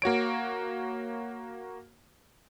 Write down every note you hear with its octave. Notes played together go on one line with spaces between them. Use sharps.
A#3 F#4 C#5 D7